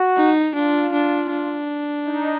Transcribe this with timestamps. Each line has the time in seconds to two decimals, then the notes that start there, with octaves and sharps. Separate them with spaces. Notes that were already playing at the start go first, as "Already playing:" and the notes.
Already playing: F#4
0.17 D#4
0.55 D4 F4
0.93 D4
1.31 D4
2.05 D#4